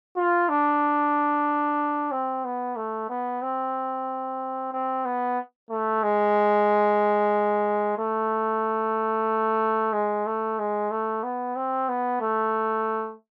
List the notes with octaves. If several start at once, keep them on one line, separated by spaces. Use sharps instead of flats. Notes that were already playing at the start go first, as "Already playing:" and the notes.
F4
D4
C4
B3
A3
B3
C4
C4
B3
A3
G#3
A3
G#3
A3
G#3
A3
B3
C4
B3
A3